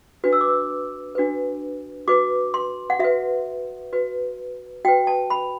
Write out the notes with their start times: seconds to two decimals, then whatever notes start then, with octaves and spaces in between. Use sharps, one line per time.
0.24 D4 F#4 B4
0.33 E6
0.41 D6
0.48 E6
1.15 D4 F#4 B4
2.08 F#4 B4 D6
2.54 C6
2.90 F#5
2.99 F#4 B4 E5
3.93 F#4 B4
4.85 F#4 B4 G5
5.07 A5
5.30 B5